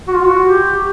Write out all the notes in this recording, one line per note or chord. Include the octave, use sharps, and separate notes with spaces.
F#4
F4
F#4
G4